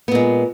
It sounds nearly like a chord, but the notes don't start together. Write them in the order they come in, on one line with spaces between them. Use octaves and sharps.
B3 A#2 G#3